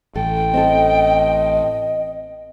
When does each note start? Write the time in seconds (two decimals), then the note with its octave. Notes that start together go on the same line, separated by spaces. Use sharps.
0.16 A1 A4 G5
0.54 C4 A4 D#5